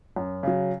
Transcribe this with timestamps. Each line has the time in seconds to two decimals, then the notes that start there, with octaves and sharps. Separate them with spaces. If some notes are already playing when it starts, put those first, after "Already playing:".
0.16 F#2
0.43 C#3 F#3